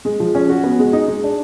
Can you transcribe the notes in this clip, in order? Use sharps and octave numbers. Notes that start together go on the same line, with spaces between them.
G#3
F3
C#4
F#4
B3
G#3
D#4
G#3
D4